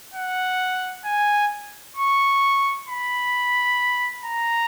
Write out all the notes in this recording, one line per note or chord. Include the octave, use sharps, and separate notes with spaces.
F#5
G#5
C#6
B5
A#5